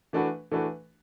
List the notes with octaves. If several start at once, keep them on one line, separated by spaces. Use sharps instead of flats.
E3 A3 D4 F#4 B4
E3 A3 D4 F#4 B4